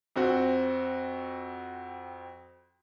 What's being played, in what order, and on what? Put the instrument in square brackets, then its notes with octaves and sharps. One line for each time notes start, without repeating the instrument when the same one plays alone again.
[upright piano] F2 C4 F#4